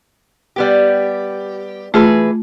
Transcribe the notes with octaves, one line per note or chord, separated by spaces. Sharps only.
G3 B3 G4
E3 A3 F4 G#4 B4